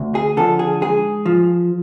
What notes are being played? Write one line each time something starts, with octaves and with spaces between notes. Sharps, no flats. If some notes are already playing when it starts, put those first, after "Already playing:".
Already playing: D2
G#4
D3 F3 A4
G#4
G#2 G#4
F3